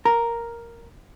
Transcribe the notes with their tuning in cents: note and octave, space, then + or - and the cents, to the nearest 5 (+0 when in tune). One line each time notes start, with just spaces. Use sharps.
A#4 +0 A#5 +0